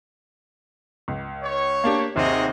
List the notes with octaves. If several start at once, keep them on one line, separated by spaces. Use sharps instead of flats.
C#2
C#5
A#3 D4 G4
D#2 C3 F#4 G#4 D#5